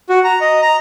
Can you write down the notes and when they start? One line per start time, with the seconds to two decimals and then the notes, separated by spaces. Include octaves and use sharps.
0.09 F#4
0.24 A#5
0.41 D#5
0.62 A#5